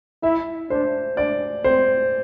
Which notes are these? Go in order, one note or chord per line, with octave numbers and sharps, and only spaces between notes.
E4 E5
D4 C5
D4 D5
C4 C5